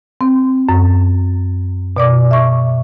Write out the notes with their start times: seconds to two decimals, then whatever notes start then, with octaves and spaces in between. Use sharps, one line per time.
0.21 C4
0.69 F#2
1.97 B2 D5 D6
2.31 E5 C#6